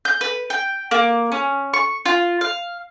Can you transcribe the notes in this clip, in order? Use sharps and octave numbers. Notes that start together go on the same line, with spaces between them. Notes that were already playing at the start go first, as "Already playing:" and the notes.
G6
B4
G5
A#3
C#4
C#6
F4
F5